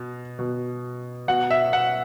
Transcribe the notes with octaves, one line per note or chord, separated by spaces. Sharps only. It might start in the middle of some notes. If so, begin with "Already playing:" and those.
Already playing: B2
B2
B2 F#5
E5
F#5